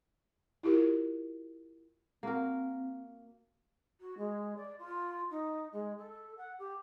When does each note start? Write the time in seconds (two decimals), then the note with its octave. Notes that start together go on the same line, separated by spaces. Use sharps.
0.63 E4 F4 G4 A#4
2.23 A#3 C4 F#4 A#4
4.00 F#4
4.18 G#3
4.57 D5
4.79 F4
5.30 D#4
5.72 G#3
5.98 A4
6.38 F#5
6.59 G4